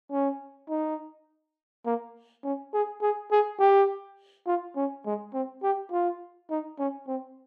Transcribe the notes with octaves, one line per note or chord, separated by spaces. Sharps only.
C#4
D#4
A#3
C#4
G#4
G#4
G#4
G4
F4
C#4
G#3
C4
G4
F4
D#4
C#4
C4